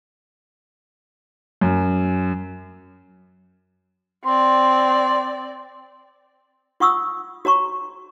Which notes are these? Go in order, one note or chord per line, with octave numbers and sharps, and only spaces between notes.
F#2
C4 D5 C6
F4 F#5 C#6 D#6 E6
F#4 C#5 A#5 C#6